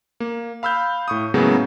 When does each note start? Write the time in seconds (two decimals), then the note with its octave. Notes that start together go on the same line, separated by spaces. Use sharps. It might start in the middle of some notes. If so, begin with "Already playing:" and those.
0.20 A#3
0.63 F5 B5 E6 F6 G6
1.08 A2 C#6 D#6
1.34 A2 C#3 F#3 G#3 A#3 B3